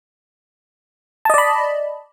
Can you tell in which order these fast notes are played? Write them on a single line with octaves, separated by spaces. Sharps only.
A5 D#5 D5 B5